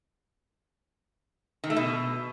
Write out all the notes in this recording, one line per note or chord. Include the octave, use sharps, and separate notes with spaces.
D#3
A3
B2